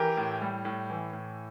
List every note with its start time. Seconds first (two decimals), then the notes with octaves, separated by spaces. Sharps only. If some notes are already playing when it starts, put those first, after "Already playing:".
Already playing: E3 G4 A#4
0.17 A2
0.41 G3
0.65 A2
0.90 E3
1.13 A2